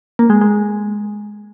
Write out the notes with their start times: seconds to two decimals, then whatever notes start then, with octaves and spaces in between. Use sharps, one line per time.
0.19 A#3
0.30 G#3
0.41 G#3